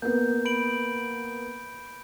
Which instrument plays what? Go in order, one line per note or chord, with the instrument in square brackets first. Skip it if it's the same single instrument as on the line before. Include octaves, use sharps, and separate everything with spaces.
[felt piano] A#3 B3 [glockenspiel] G6
[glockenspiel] B5 D7 F#7